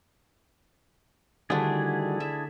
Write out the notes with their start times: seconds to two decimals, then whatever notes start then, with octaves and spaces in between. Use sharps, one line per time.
1.50 D3 D#3 G3 A3 D4 E4 F#4 G#4
2.20 E5